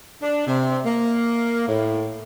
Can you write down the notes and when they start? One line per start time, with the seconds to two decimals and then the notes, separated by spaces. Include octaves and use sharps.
0.22 D4
0.47 C3
0.86 A#3
1.68 A2